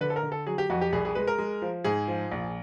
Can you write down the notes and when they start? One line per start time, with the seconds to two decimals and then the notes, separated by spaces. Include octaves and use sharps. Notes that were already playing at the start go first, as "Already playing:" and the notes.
0.01 D3 B4
0.10 A4
0.16 A#4
0.23 D3
0.32 A4
0.47 F#3 G#4
0.58 G4
0.70 F2 F#4
0.81 G4
0.93 C2 G#4
1.05 G#4
1.15 G#3 B4
1.27 A#4
1.38 G#3
1.62 F3
1.84 G#2 G#4
2.08 F3
2.32 A#1